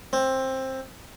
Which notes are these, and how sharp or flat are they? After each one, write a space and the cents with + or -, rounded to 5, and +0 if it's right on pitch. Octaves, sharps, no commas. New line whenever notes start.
C4 +15